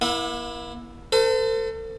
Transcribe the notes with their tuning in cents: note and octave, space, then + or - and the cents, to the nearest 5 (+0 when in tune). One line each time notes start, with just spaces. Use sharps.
A#3 +40 E4 +0 F#5 -40
A4 +35 C5 -45